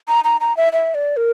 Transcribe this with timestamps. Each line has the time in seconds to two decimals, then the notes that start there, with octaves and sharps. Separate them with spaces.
0.08 A#5
0.24 A#5
0.41 A#5
0.57 E5
0.73 E5
0.95 D5
1.17 A#4